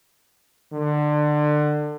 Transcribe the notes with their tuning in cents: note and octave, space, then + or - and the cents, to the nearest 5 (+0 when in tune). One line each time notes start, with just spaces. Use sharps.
D3 +25